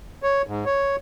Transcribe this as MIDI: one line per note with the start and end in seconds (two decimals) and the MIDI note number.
0.23 0.42 73
0.47 0.64 44
0.66 0.96 73